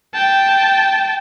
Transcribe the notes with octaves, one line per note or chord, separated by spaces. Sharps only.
G5 A5